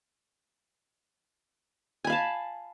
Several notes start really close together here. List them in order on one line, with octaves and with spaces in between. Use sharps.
G#5 B5 F5 A5